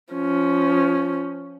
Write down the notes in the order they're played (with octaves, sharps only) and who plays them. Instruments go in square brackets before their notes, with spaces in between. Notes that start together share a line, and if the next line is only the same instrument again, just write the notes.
[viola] F3 C#4